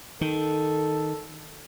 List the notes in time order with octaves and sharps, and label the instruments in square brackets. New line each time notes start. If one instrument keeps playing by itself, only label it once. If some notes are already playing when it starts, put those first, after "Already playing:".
[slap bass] D#3 [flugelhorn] A4